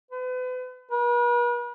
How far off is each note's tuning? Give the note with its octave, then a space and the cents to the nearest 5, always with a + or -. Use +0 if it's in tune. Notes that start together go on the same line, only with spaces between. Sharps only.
B4 +40
B4 -45